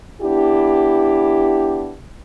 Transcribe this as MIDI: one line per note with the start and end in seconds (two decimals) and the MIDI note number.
0.22 1.94 59
0.22 1.94 62
0.22 1.94 64
0.22 1.94 67